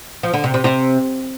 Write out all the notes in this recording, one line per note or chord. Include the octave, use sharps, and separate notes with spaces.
F3
D3
C3
C3
C3